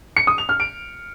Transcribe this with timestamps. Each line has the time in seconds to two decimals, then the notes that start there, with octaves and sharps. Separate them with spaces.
0.17 C#7
0.27 D#6
0.38 F7
0.49 F6
0.60 D7